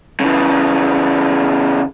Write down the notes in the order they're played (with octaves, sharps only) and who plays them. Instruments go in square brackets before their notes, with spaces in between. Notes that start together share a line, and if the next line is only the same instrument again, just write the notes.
[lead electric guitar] C#3 E3